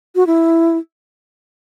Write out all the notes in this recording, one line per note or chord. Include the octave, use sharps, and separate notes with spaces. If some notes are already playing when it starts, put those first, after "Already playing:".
F#4
E4